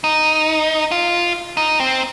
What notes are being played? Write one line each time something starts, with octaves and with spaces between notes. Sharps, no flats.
D#4
F4
D#4
C4